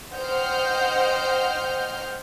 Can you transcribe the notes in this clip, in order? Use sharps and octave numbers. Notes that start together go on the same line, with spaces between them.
C5 D#5 F#5 G5 F6 G6